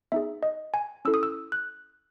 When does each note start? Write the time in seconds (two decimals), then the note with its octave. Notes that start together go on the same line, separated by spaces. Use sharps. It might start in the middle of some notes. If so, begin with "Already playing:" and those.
0.12 B3 D#4 G#4 E5
0.43 D#5
0.74 G#5
1.05 C#4 E4 A4 E6
1.14 D#6
1.23 E6
1.52 F#6